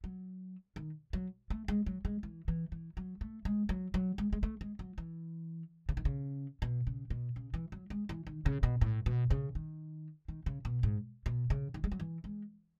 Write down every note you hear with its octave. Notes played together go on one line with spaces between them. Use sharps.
F#3
D#3
F#3
A3
G#3
F#3
G#3
E3
E3
E3
F#3
A3
G#3
F#3
F#3
G#3
G#3
A3
G#3
F#3
E3
C#3
D#3
C#3
B2
C#3
B2
C#3
E3
F#3
G#3
E3
D#3
C#3
B2
A2
B2
C#3
D#3
D#3
C#3
B2
G#2
B2
C#3
D#3
G#3
F#3
E3
G#3